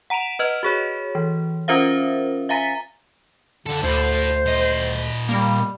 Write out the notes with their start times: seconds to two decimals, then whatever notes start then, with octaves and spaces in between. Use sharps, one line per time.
0.10 F#5 A#5 D7 E7 F7
0.39 B4 D#5 F6
0.63 F#4 G#4 C#5
1.15 E3
1.68 C#4 F4 A#4 C5 E5 F5
2.49 E5 F5 G#5 A#5 A6 B6
3.66 D3 F4 A4
3.83 D2 A3 E4 C5
4.46 A#2 D#5
5.29 G3 A#3